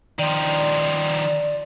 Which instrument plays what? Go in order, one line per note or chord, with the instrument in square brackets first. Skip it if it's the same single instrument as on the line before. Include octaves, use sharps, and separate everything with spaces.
[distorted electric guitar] D#3 F3 [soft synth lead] D5